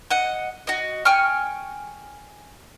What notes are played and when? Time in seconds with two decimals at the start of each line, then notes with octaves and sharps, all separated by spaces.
0.10 D#5 F#5
0.67 F#4 D#5
1.05 G5 G#5 C#6 F6